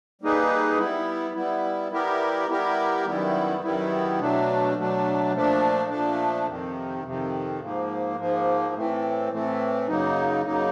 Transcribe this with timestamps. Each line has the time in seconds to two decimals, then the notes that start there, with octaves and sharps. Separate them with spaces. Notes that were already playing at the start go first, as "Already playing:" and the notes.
0.22 G3 A#3 D#4 G#4 B4
0.78 G3 B3 E4
1.35 G3 B3 E4
1.92 G3 B3 E4 G4 A#4
2.49 G3 B3 E4 G4 A#4
3.05 F#2 D#3 G3 B3 E4
3.62 F#2 D#3 G3 B3 E4
4.19 B2 F#3 A3 D4
4.77 B2 F#3 A3 D4
5.33 A#2 F3 A3 D4
5.90 A#2 F3 A3 D4
6.47 F2 C3 D#3
7.03 F2 C3 D#3
7.60 G#2 F3 A#3
8.17 G#2 F3 A#3
8.74 A2 E3 A3 C4
9.31 A2 E3 A3 C4
9.88 F#2 C#3 F#3 A#3 D#4
10.45 F#2 C#3 F#3 A#3 D#4